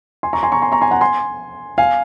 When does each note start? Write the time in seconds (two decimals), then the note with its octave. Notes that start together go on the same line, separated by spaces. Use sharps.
0.23 G#5 C6
0.33 A#5 C#6
0.43 G#5 C6
0.52 A#5 C#6
0.62 G#5 C6
0.72 A#5 C#6
0.81 G#5 C6
0.91 F#5 A#5
1.01 G#5 C6
1.78 F5 G#5